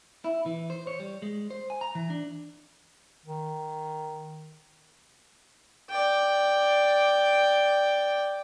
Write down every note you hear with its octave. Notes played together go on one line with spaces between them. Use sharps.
E4
E3
C5
C#5
G3
G#3
C5
G#5
A#5
E3
D4
D#3
D5 G5